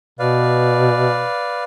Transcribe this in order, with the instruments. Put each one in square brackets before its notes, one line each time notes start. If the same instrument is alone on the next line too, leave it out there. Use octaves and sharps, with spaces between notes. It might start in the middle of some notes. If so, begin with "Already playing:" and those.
[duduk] B2 [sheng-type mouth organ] B4 D5 F5